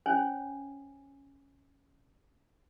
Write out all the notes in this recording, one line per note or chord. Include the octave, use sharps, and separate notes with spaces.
C#4 C5 C#5 G#5